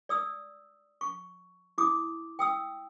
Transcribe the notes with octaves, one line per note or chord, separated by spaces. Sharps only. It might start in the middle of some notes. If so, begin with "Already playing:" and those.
D5 D#6 E6
C#6
E4 D6 D#6
G5 D#6 E6